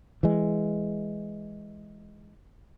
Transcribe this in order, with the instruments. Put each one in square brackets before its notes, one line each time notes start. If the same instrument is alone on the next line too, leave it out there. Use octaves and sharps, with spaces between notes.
[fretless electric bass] E3 G#3